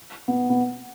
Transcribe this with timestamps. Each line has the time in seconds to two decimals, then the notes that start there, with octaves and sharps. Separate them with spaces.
0.28 B3
0.50 B3